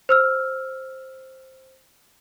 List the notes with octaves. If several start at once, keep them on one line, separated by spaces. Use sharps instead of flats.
C5 E6 F6